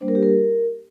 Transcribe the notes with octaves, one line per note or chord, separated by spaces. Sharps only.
G3 A#3 D4 C5
A#4
G4
A#4